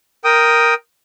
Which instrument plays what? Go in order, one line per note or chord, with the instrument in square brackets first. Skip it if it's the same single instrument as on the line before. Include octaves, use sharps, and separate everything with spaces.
[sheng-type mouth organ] A#4 G5 D#6